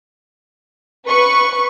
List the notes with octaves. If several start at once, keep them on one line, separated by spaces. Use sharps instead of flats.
B4 C#6